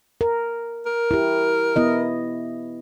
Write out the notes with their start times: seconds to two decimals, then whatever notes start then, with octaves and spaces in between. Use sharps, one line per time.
0.21 A#4
0.86 A#4
1.11 E4 G4
1.76 B3 E4 D#5